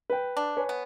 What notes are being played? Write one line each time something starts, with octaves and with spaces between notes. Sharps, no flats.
B4 G5
D4
B4 C#5 G#5
B3